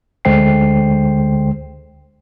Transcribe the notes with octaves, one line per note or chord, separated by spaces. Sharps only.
D2 D3 G#3 C5 G5 C7